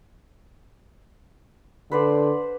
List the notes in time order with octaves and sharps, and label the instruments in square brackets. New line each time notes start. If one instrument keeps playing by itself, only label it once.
[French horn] D3 [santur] B4 C5 D5